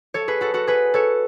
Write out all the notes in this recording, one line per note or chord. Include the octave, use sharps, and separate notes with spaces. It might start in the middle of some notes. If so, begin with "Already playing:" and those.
A4 C#5
G#4 B4
F#4 A4
F#4 A4
G#4 B4
A4 C#5